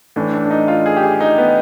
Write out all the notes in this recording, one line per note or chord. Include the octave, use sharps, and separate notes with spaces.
A2 E3 D4
D4
D4
D#4
F4
G#4
G4
G#4
D#4
B3